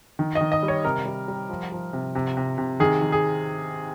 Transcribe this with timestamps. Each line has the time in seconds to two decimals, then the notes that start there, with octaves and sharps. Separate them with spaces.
0.19 D#3
0.35 D#5
0.41 D#3
0.52 D#5
0.63 G3
0.68 C#5
0.84 C3 A#4
1.05 G3
1.28 G3
1.49 F3
1.72 F3
1.93 C3
2.15 C3
2.37 C3
2.58 C3
2.80 D#3 G#4
3.02 D#3
3.12 G#4